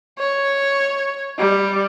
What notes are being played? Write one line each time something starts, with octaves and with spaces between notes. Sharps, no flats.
C#5
G3